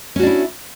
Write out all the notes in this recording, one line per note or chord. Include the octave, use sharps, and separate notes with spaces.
C#4 D4 E4 F#4